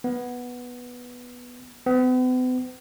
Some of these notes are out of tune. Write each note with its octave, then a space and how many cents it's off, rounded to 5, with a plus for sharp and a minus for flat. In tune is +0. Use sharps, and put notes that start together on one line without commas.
B3 -5
B3 +45